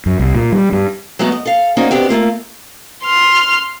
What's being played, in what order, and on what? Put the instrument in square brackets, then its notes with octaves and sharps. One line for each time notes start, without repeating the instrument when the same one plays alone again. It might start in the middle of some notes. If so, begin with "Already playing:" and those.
[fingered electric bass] F#2
C2
A#2
G3
G2
[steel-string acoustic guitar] F#3 G#3 A3 B3 F#4
D#5
A4 F5
A#3 C#4 D#4 F#4 C5 D5
B2 B3 C4 D4 G4
A3 A#3 F4
[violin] C6 F6